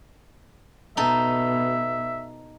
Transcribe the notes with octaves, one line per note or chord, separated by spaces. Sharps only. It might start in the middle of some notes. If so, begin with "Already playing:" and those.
B2 D#4 A4 E5